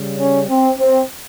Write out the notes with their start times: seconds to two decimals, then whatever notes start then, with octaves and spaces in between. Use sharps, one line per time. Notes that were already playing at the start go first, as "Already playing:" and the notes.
Already playing: C#3 G3
0.19 C#4
0.49 C4
0.79 C4